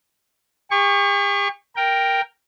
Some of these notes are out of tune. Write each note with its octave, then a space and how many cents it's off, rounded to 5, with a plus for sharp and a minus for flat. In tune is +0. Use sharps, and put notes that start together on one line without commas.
G4 +45 C#6 +0
A#4 +0 G5 +0